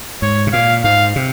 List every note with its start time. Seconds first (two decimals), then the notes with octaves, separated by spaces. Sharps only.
0.22 G#2 C#5
0.47 C3
0.53 A#2 F5
0.84 G#2 F5
1.16 C3